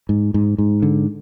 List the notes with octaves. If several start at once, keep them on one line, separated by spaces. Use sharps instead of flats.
G#2
G#2
G#2
D3